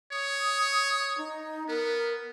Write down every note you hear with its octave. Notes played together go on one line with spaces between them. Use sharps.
C#5 D#6
D#4
B3 A#4